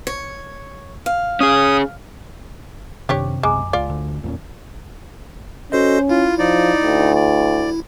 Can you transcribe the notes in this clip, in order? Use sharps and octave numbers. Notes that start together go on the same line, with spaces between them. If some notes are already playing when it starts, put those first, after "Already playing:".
C#5
F5
C#4 G#4 D#6
F#2 C3 D#3 D4 G4 C#5
B1 F#2 G#3 G#5 A#5 D6
C#2 F4 D5
D2 D3
E2 A#2 E3 C#4
C#4 F#4 A4 C5 D#5
E4 F4
F3 D#4 D5
D2
D5